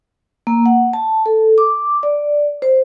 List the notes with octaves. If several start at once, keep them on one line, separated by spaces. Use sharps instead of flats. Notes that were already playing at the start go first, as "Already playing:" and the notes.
A#3
F#5
A5
A4
D6
D5
C5